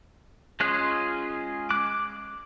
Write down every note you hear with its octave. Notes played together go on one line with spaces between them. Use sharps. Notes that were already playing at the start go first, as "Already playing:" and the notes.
G#3 C#4 F4 G#4 F#6
D6 F#6